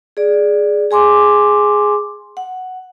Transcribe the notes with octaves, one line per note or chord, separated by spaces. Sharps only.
G#4 D5
G#4 G#5 C6 D6
F#5